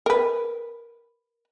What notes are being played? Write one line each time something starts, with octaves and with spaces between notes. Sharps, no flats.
A#4 B4